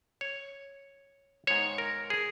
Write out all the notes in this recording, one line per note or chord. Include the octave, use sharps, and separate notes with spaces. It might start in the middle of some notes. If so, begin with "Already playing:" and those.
C#5
G#2 D#3 G#3 B3 C#5
A#4
G#4